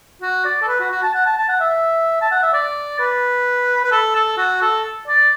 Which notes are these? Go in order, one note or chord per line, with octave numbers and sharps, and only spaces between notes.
F#4
D5
A4
B4
F#4
F#4
A5
F#5
A5
A5
F#5
E5
A5
F#5
E5
D5
B4
B4
A4
A4
F#4
A4
D5